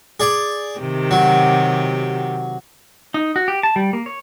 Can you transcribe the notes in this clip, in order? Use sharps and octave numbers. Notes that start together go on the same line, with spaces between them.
G#4 D5
C3 D#3 G4
F#3
D#4
F#4
G4
A5
G3
A#3
C#5